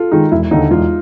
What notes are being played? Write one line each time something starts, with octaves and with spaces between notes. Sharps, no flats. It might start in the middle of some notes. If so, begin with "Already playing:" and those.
Already playing: F4 A4
D#3 G#3 D#4
E1 E4
D#2 D3 D#4
E1 F4